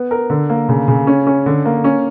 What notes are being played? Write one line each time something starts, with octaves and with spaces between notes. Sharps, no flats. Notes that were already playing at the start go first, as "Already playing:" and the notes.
Already playing: B3
A#4
D3
A#3
C#3
C#3
C#4
C#4
D3
A#3
C#4